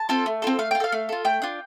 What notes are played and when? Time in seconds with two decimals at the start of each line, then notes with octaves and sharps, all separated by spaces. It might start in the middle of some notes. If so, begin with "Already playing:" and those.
Already playing: A5
0.09 C4 F4 A4
0.26 A3
0.42 C4 F4 A4
0.59 A3 F5
0.71 F4 G5
0.80 A4 F5
0.92 A3
1.09 F4 A4
1.25 A3 G5
1.42 D4 F4